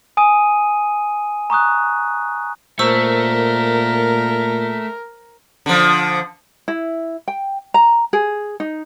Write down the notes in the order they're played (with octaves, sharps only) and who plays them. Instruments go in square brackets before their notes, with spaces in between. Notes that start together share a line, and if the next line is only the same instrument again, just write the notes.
[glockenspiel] G#5 D#6 D#7
A#5 C#6 D#6 F#6
[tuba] A#2 [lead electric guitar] A3 A4 [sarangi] A#4 [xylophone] C5 C#6 E6
[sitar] D3 F3
[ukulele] E4
G5
A#5
G#4
D#4